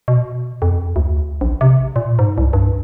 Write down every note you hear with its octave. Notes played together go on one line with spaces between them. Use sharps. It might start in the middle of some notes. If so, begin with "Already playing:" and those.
B2
F2
D2
A#1
C3
A#2
G#2
C2
G2